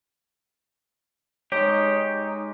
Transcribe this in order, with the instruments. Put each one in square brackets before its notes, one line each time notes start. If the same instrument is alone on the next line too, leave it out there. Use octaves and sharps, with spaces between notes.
[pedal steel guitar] G#3 D#4 [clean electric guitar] G4 [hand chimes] C#5